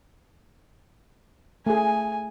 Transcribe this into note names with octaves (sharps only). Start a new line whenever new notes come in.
A3 G#4 G#5